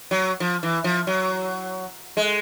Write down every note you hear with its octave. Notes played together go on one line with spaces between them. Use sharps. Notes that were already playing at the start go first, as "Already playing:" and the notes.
F#3
F3
E3
F3
F#3
G#3